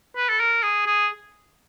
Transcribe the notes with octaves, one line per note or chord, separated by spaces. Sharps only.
B4
A4
A#4
G#4
G#4